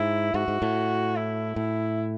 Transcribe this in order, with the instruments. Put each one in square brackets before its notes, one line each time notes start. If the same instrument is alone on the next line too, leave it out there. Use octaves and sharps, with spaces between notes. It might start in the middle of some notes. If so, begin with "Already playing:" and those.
Already playing: [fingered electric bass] G#2 [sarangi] E4
[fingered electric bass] G#2 [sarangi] F#4
[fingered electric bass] G#2
A2
[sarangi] E4
[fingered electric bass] A2 [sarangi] E4